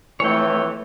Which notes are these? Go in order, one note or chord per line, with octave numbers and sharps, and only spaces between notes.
F2 A2 E3 A3 C#5 G5